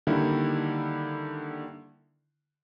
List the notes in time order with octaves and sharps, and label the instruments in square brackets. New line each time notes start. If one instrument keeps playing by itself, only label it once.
[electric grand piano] D3 D#3 G3 A#3 E4